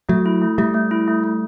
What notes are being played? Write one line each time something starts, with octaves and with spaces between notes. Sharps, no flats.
F#3 A3
E4
A3
G3 A3
A3
E4
A3
A3